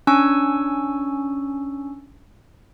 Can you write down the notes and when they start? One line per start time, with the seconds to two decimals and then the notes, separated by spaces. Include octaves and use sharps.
0.07 C#4 D4 G#5 C#6 E6